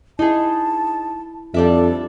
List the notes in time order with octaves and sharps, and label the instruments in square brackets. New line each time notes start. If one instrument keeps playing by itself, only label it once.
[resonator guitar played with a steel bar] D#4 G#4 [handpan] E4 [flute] A5
[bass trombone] F2 [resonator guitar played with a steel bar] G3 D4 E5 [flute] A4